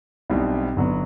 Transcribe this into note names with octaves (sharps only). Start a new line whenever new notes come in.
B1 B2 G3 C4 E4
G1 G2 F#3 B3